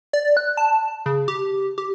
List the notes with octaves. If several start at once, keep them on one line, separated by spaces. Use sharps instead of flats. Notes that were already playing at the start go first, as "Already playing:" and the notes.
D5
F#6
A5
C#3
G4
G4